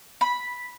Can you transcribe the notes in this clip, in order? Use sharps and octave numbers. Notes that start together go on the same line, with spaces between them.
B5